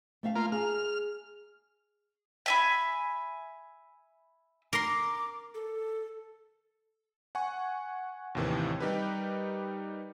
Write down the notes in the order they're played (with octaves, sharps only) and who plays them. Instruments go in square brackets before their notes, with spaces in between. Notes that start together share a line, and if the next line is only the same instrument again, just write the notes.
[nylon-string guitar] A3 E5 F5
[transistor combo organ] A#3 F4
[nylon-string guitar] G#4 [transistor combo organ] F6
[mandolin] E5 G#5 B5
[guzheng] A#4 C6 [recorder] D6
[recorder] A4
[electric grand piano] F#5 G#5 C#6
D#2 A2 C3 D#3 E3
G3 D#4 G4 A#4 B4